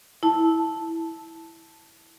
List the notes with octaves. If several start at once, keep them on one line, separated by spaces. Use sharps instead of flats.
E4 A5